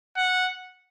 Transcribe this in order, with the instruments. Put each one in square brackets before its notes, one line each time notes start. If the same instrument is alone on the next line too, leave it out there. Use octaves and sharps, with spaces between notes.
[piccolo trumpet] F#5